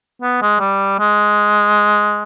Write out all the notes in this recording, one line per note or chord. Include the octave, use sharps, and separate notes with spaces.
B3
G#3
G3
G#3